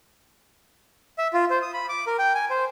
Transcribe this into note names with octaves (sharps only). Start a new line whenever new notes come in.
E5
F4
C5
D#6
B5
D6
A#4
G5
G#5
C5